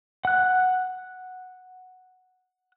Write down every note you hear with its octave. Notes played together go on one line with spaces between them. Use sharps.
F#5 F#6